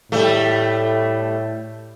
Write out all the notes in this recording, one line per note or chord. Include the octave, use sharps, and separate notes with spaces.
A2 G3 A3